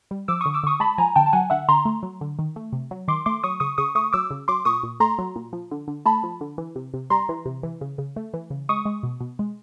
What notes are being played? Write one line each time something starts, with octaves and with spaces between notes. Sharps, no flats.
G3
F3 D6 E6
D3 C#6 D#6
D6 E6
D3 C#6 D#6
G#3 A5 B5
F3 G#5 A#5
D3 G5 A5
A5
F#3 F#5 G#5
D3 E5 F#5
D3 A#5 C6
A3
F#3
D3
D#3
A3
C3
F#3
D#3 C6 D6
A3 C6 D6
F#3 C#6 D#6
C#3 C#6 D#6
C#3 C#6 D#6
A3 C#6 D#6
F#3 D6 E6
C#3
F#3 C6 D6
A#2 C#6 D#6
A#2
A3 A#5 C6
F#3
A#2
F3
D3
D3
A3 A5 B5
F3
D3
E3
C3
C3
G3 A#5 C6
E3
C3
E3
C#3
C#3
A3
E3
C#3
G#3 C#6 D#6
G#3
B2
B2
G#3